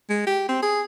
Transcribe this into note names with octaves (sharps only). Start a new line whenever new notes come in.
G#3
G4
C4
G#4